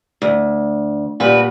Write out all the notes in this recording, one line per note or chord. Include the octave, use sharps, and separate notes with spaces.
D2
A#2 G3 F#4 B4